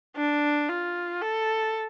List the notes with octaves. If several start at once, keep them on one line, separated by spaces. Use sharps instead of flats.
D4
F4
A4